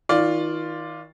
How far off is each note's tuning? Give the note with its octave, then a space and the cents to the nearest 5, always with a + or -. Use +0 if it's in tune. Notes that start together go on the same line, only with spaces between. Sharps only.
D#3 +35 F4 +0 D5 +0